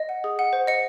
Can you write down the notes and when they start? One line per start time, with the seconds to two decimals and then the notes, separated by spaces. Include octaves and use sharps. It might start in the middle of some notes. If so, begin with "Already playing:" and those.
Already playing: D#5
0.09 F#5
0.24 G#4
0.39 F#5
0.53 C5
0.67 D#5 C#7